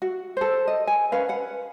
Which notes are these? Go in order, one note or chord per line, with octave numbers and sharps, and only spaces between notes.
F#4
A4 C5
D#5
G#5
C#4 B4 F5
B4 F#5